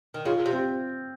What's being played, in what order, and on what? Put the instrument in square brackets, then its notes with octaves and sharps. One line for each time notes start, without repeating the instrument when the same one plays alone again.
[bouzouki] D#3
[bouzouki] C#3 [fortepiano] F4
[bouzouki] C3
[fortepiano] C4